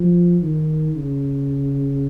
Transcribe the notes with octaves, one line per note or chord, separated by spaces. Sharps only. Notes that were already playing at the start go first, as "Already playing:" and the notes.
Already playing: F3
D#3
C#3